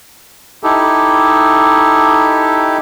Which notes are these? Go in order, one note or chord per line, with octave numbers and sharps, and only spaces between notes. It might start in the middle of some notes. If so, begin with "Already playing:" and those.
D#4 E4 G4 A4